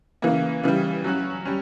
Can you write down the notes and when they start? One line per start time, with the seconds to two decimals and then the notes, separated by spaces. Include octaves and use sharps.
0.22 C#3 E3 A#3
0.63 C#3 E3 G3
1.04 F#3 C#4 F#4
1.45 G3 C#4